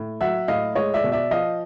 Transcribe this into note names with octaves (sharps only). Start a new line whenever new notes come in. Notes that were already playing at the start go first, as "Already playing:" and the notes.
Already playing: A2
F#3 E5 F#5
A2 D#5 F5
G#3 C#5 D#5
D5 E5
B2
D5 E5
F3 D#5 F5